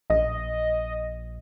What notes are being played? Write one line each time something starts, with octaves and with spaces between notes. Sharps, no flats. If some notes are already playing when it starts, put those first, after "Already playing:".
A#1 D#5